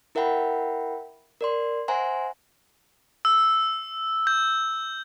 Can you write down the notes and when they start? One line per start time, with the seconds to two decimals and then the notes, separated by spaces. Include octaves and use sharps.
0.15 E4 A#4 E5 F#5 G5 B5
1.41 A#4 D5 C6
1.88 C5 E5 F#5 G#5 A#5 C6
3.25 E6
4.27 G6